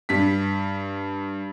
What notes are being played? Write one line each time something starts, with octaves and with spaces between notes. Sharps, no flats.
G2 B6